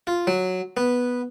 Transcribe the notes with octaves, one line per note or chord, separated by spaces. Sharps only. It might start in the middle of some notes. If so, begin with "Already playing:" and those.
F4
F#3
B3